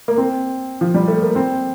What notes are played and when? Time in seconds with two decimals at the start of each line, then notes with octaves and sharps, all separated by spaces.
0.08 A#3
0.18 C4
0.81 F3
0.94 G3
1.08 A3
1.22 A#3
1.35 C4